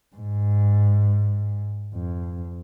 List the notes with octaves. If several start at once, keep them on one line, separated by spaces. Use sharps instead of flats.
G#2
F2